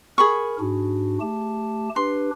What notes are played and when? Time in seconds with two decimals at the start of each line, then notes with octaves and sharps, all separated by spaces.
0.18 G#4 A#4 B5 C#6
0.60 G#2 D4 F#4
1.21 A3 G4 A5
1.96 D4 G4 B4 C6